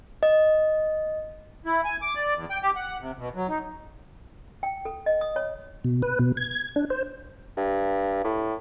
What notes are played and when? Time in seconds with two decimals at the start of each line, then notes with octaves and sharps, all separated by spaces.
0.23 D#5
1.66 E4
1.85 G#5
2.02 D6
2.15 D5
2.35 E2
2.50 G5
2.62 G4
2.76 F#5
3.01 C3
3.18 B2
3.35 F#3
3.48 D#4
4.63 G5
4.85 A4
5.06 D#5
5.21 D#6
5.36 C#5
5.84 B2
6.02 B4
6.19 B2
6.37 G#6
6.76 D4
6.90 C5
7.57 G2
8.24 A2